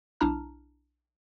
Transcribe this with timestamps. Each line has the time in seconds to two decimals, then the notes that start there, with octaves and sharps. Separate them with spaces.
0.21 B1 D4 E4 A5 A#5 F6